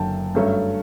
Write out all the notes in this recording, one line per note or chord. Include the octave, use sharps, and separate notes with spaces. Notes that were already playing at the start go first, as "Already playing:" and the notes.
Already playing: F#1 F#2 D3 G5 A5
G2 F#3 A3 C#4